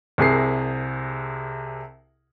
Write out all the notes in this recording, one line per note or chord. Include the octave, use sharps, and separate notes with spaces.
C2 C3 G#4 A#4 C7